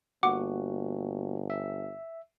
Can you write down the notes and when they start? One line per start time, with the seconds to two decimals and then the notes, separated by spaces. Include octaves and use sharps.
0.23 G1 A#3 F#4 F#5 D6
1.50 E5